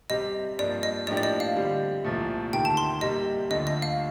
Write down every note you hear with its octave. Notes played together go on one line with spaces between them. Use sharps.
C3 G3 C4 G4 D#5
G2 F3 A#3 D5
D#5
A2 F3 A#3 D4 G4 D5
D5
D#5
F5
D3 G3 C4
C2 A#2 F3 A3
D2 C3 D#3 G5
A5
C6
C3 G3 A#3 D#5
D2 D3 F3 A3 D#5
D#5
F5